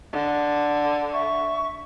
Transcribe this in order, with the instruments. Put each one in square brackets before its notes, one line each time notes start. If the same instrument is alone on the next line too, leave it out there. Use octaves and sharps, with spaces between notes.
[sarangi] D3
[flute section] E5 C#6